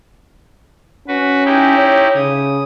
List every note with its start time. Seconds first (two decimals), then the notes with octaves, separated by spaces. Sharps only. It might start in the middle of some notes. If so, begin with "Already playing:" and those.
1.08 C#4 F#4 B4
1.45 D#4 E4 G4
1.78 C#5
2.16 C#3 D#6